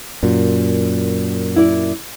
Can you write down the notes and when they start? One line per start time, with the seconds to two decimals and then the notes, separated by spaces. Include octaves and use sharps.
0.23 F#2 A#2
1.56 E4 D5